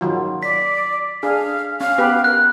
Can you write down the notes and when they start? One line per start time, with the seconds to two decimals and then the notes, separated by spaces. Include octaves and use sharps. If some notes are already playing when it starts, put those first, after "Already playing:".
0.01 D#3 F#3 F4
0.43 D5 B6
1.23 D4 G#4 F5
1.81 C#4 F5
1.98 B3 G4 B4
2.24 A#4 F#6